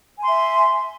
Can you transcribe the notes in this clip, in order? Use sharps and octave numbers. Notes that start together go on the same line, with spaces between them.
E5 G#5 C6